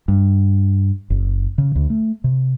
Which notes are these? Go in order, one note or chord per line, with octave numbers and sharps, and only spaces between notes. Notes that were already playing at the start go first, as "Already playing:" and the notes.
G2
F#1
C#3
D2
A3
C3